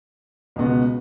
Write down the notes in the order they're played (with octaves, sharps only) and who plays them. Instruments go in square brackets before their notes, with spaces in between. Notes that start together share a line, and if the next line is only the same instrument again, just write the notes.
[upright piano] C#2 B2 B3 F#4